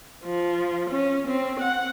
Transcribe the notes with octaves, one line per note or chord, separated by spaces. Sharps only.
F3
C#4
C4
F#5